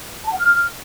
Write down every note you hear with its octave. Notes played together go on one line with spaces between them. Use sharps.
A5
F#5
F6